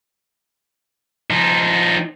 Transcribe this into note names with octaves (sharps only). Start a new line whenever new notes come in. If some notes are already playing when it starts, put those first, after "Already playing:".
F3 D#4